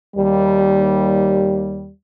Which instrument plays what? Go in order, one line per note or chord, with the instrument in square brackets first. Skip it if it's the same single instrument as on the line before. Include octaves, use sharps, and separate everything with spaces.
[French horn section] D#2 G3